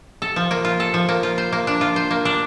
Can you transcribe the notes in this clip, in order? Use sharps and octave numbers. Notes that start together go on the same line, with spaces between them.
A4
F3
A#3
F4
A4
F3
A#3
F4
C5
A#3
D4
F4
C5
A#3
D4